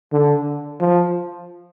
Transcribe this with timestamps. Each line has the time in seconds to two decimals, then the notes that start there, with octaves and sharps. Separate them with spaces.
0.13 D3
0.80 F3